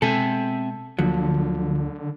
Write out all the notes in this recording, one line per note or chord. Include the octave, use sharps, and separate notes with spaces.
B2 G#3 B3 C4 A4 E5 G#5
D2 D3 F3 F#3 A#3